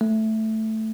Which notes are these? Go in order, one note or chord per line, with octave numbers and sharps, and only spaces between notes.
A3